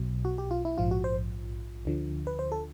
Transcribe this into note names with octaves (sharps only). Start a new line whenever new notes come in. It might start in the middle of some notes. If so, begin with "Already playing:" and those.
Already playing: B1 B2 F#3
F#4
G4
F4
E4
A#1 G#2 F3 F4
F#4
C5
D2 D3 F3
B4
C5
A4